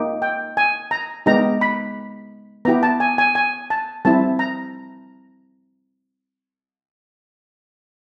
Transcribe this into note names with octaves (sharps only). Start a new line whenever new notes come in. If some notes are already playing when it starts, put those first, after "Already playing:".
Already playing: A#3 D#4 G4
G5
G#5
A#5
G#3 B3 D#4 G4 A#5
B5
B3 E4 G4 A#5
A5
G#5
G#5
G#5
A5
G3 C4 E4 A5
A#5